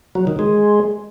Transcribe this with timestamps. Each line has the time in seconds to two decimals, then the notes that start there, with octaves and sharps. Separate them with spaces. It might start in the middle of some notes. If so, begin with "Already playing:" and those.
0.15 F#3
0.27 D#3
0.39 G#3